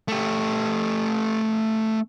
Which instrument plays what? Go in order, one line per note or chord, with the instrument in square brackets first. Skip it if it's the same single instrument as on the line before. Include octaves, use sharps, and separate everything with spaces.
[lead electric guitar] A3 G4